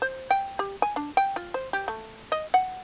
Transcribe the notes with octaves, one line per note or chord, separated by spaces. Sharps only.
C5
G5
G4
G#5
D4
G5
F4
C5
G4
A3
D#5
F#5